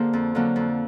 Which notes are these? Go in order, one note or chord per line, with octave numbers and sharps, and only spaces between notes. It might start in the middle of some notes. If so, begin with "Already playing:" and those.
Already playing: D3 A#3 G#4 C5
F2
D3 F#3 A#3
F2